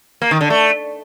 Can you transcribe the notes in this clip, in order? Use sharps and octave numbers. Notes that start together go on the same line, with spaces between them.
A#3
D#3
D3
A3